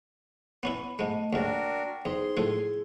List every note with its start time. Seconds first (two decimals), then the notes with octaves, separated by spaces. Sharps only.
0.63 B3 C#4 E4 B5
0.99 G#2 G#3 A3 D#5
1.33 D#2 G#2 D4 F#4 A#4 G5
2.05 E2 D#4 G#4 C5 C6
2.37 A2 F3 E4 G#4